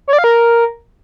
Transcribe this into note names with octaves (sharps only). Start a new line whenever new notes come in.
C#5
D5
F5
A#4